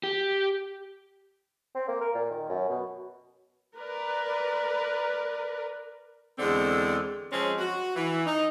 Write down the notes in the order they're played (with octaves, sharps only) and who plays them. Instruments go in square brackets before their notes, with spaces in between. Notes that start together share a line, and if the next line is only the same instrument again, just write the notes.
[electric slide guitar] G4
[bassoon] C4
A#3
A#4
A#2
D#3
F#2
B2
[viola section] A#4 B4 D5
[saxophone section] E2 D3 G#3 C4 A4
F3 G#3 C4 C#4
F#4
E3
D#4